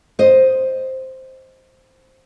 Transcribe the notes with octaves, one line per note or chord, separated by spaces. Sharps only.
C5 D#5